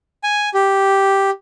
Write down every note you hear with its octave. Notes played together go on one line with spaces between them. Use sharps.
G#5
G4